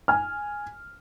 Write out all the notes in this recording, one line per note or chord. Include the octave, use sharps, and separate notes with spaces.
G#5 F6